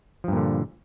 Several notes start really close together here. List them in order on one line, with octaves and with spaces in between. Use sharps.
F3 G2 A#2 D3